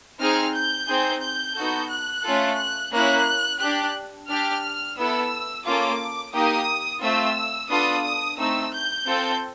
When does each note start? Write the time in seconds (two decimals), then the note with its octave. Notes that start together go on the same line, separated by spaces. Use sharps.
0.19 C4 D#4 G#4 F6
0.53 G6
0.87 C4 D#4 G#4
1.21 G6
1.55 B3 D#4 F#4 A4
1.90 F#6
2.24 A3 C#4 F4 A4
2.57 F#6
2.91 A#3 C#4 E4 F#6
3.60 D4 G4 F#6
4.28 D4 G4 F6
4.96 B3 E4 A4 E6
5.65 A#3 C#4 F4 A4 D6
6.33 A#3 D#4 G4 D#6
7.01 A3 C4 F4 E6
7.69 B3 D4 F4 A4 D#6
8.03 D#6
8.37 A3 C4 D#4 E6
8.72 G6
9.06 C4 F4 A4